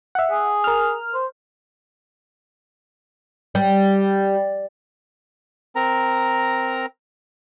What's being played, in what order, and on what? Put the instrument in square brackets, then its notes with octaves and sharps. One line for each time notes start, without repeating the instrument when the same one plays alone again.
[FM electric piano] E5 F#5
[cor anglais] G#4
[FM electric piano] A#4 F6
[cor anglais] C5
[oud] G3
[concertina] C4 A#4 A#5